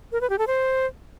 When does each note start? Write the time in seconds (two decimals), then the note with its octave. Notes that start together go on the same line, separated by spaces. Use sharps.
0.12 A#4
0.21 B4
0.30 G4
0.39 A4
0.47 C5